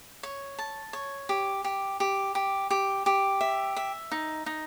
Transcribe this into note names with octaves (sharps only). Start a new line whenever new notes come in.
C#5
A5
C#5
G4
G4
G4
G4
G4
G4
E5
E5
D#4
D#4